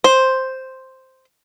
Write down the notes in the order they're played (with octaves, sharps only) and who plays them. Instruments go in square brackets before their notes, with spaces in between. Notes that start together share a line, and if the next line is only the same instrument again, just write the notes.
[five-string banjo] C5